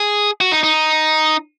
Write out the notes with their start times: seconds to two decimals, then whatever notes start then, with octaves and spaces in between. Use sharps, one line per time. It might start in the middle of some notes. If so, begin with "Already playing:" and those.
Already playing: G#4
0.41 F#4
0.52 D#4
0.63 D#4